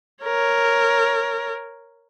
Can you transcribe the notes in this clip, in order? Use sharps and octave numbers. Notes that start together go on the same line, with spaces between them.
A#4 C#5